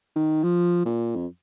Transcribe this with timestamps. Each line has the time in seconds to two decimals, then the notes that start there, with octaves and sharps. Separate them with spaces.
0.16 D#3
0.43 F3
0.85 A#2
1.16 F2